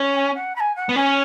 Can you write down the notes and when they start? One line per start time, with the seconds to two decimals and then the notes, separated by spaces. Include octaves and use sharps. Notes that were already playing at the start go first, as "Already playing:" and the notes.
Already playing: C#4
0.14 G#5
0.34 F#5
0.55 B5
0.60 G#5
0.75 F#5
0.89 B3
0.96 C#4 G#5